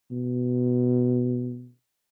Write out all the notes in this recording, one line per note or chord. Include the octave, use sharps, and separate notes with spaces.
B2